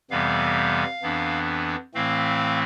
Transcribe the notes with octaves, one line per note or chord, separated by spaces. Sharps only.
F2 C3 E3 G3 B3 F5
F2 E3 B3 D4
A2 E3 A3 C4 F5